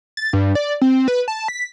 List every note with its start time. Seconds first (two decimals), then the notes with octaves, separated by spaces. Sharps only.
0.17 A6
0.33 G2
0.55 D5
0.81 C4
1.08 B4
1.28 A5
1.48 B6